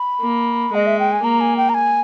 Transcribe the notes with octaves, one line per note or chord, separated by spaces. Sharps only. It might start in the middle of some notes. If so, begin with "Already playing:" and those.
Already playing: B5
A#3
G#3 D#5
E5
G5
G#5
A#3 A#5
G#5
G5
A#5
G#5